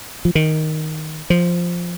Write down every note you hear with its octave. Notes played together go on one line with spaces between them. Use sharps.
F3
D#3
F3